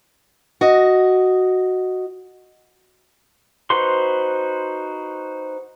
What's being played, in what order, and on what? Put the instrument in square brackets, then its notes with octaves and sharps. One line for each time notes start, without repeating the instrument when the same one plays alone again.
[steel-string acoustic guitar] F#4 D#5
[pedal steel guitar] D#4 F#4 B4 C5 C6